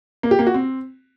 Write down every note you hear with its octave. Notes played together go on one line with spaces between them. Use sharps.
A#3
G4
A#3
F#4
C4